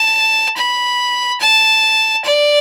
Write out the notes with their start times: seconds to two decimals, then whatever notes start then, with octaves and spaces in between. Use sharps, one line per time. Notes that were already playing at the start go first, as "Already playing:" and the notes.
Already playing: A5
0.57 B5
1.40 A5
2.25 D5